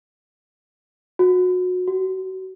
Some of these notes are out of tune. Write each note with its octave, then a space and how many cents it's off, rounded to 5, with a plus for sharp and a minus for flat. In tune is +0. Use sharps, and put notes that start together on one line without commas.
F#4 -25
F#4 +30